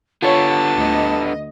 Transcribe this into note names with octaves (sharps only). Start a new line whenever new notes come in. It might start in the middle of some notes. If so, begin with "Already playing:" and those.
D3 B3 F4 C#5 A5
D2 D#5